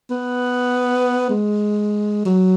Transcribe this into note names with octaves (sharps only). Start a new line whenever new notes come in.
B3
G#3
F#3